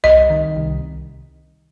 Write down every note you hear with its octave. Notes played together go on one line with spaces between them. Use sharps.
C2 D#5
D#3
C2